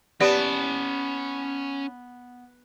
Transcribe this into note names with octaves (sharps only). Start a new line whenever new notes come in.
B3 C#4 G4 D5 A5